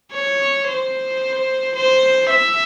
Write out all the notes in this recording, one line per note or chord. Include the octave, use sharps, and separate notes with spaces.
C#5
C5
C5
E5